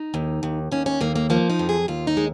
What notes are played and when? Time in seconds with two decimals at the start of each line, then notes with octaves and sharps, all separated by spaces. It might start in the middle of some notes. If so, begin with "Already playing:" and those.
Already playing: D#4
0.14 D#2
0.43 D#2
0.72 D#2 C#4
0.86 C#4
1.01 D#2 A#3
1.16 A#3
1.30 F3 A#3
1.50 D#4
1.59 F2
1.69 G#4
1.88 D#2 F4
2.07 D#4
2.17 G#3